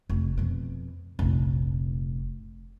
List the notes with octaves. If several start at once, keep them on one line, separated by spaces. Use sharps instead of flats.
F1
F2 B2
F1 A#1